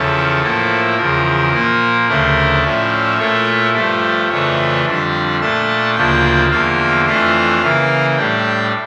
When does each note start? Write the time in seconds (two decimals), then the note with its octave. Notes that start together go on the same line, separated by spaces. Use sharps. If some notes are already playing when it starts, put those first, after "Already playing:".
Already playing: E2 C#3 F3 C#4 E4 A4
0.42 A2 F3 A#3 E4
0.98 E2 C#3 F3 A#4
1.53 A#2 F3 A#3
2.08 D2 C#3 F3 A3 D4 A#4
2.63 A2 F3 C#4 E4 D5
3.19 A#2 A3 E4 C#5
3.74 G2 F3 A3 D5
4.30 F2 C#3 E3 A3 D4 C#5
4.85 F2 D3 G3 D4 D5
5.40 A#2 A3 D4 A5
5.96 D2 C#3 F3 A#3 D4 G5
6.50 E2 D3 F3 A#3 F5
7.06 F2 E3 A3 D4 F5
7.62 C#3 E3 A#3
8.17 A2 G3 D4 G5